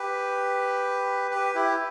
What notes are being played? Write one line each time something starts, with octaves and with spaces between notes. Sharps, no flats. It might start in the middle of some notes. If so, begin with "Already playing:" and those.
Already playing: G4 B4
G4 B4
E4 G4